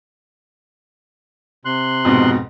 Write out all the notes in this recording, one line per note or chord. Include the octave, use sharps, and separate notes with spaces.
C3 C6 F#6
F2 G#2 B2